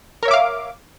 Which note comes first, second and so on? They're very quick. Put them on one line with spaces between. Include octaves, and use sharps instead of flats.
A#4 C#5 E5 D6 F5